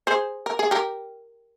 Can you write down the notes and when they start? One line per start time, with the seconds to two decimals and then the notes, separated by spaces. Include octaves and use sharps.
0.07 G#4 C5
0.46 A#4
0.59 G#4
0.71 G4 A#4